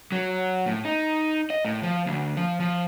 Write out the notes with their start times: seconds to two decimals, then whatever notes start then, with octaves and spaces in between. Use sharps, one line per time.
0.12 F#3
0.66 A2
0.85 D#4
1.50 D#5
1.65 A2
1.83 F3
2.06 D2
2.37 F3
2.60 F3